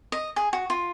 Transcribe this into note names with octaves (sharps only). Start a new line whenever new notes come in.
D#5
G#4
F#4
F4